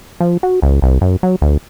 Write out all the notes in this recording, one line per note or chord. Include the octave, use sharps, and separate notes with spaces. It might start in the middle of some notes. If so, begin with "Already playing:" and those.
F3
F#4
C#2
C2
F#2
F#3
D2